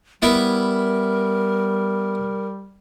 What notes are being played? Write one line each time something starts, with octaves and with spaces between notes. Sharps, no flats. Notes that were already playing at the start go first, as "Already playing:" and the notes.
G3 B3 E4 A#4 E5